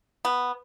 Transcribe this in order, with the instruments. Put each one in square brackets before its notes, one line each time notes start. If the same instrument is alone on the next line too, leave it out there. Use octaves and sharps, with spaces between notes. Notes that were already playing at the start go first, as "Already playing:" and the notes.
[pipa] B3